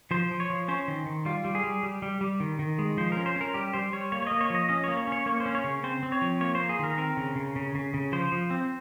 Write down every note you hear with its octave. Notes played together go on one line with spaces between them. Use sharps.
F3 C5
F3
C#5
F3
C#4 C5
D#3
D#3
G3 F4
G3
G#4
G3
G3
G3
G3
D#3
D#3
G#3
F3 C5
C#4 A#4
C5
C#4 A#4
G3 G4
G3 C5
G3 C#5
A#3 C#5
C#5
A#3 D#5
C#5
F3 D#5
C#4 D#5
A#3 C#5
C#5
C#4 C#5
A#3 C#5
C5
C#4
C#5
C#3
C4 C5
C4
C#5
F3
A#3 C#5
A#3 C5
G#4
D#3 A#4
C4 A#4
C#3
C#3
C#3
C#3
C#3
F3 C5
F3
C4